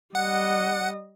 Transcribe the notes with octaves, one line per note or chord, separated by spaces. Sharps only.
G3 D#5 F#5